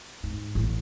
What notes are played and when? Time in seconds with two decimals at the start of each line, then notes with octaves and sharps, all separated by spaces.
0.23 G#2
0.55 A1